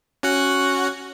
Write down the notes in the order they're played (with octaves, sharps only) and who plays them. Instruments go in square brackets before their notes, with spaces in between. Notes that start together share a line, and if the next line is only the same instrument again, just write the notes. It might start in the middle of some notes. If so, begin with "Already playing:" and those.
[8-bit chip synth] C#4 F#4 F#5